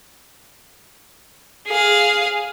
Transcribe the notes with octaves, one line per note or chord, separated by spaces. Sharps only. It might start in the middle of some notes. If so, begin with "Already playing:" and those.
G#4 F5